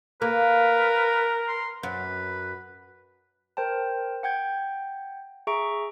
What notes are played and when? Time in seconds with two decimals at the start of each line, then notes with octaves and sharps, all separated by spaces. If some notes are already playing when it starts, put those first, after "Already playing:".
0.22 A#3 A#4 B4
1.48 C6
1.83 F#2 B4
3.57 A#4 C5 G5 A5
4.23 F#5 G5 G6 G#6
5.47 G#4 E5 A#5 C#6 D7